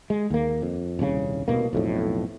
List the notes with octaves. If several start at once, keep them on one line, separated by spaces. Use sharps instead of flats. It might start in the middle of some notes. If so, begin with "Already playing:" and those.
G#3
D#2 A#3
F2
D#1 C2 A#2 C#3
C2 B2 A#3
B1 F2 A2